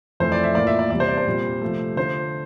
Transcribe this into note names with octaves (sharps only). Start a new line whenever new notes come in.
F2 E3 A3 C5
D5
E5
A2 E3 A#3 F4 D5
E5
D5
E2 C3 G3 D5
C5
D5
C5
A#2 G3 C4
C3 F3 A3
D3 A3 D4 F4 C5